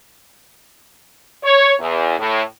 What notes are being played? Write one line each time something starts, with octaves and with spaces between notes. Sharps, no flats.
C#5
E2
A2